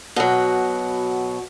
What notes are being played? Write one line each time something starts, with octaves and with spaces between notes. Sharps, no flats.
B2 F#3